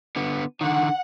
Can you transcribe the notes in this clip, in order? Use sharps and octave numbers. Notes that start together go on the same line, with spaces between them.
D3 B3
D3 D#3 F#5